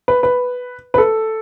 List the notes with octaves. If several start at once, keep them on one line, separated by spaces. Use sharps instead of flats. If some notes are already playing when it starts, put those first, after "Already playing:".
B4
B4
B4
A4